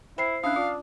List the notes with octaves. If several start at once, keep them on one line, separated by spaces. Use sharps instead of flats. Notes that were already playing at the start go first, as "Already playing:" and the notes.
E4 C5 G5 B5 C7
C#4 D4 E4 F5 D#6 F#6
D4 F4 D#6